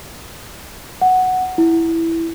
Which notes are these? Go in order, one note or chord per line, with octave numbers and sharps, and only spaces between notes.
F#5
E4